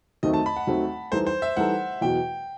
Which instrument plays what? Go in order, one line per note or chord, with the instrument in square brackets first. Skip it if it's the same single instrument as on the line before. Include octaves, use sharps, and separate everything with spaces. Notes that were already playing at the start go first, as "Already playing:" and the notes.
[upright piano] D#2 D#3 F#3 A3 C4 [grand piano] D#5
[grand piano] A5
B5
F#5
[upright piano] D#2 D#3 F#3 A3 C4
[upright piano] E3 G3 D#4 A4 [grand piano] C5
[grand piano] C5
E5
[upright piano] E3 G3 D#4 A4 [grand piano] F#5
[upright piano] E2 B2 F#3 [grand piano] G5